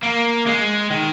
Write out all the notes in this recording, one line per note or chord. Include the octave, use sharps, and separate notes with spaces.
A#3
G#3
D#3